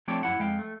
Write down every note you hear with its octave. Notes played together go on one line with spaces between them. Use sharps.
F3 A3 C4 D4 C#5 D5
F#2 E4 F#5
F2 G#3 F5 G5
A3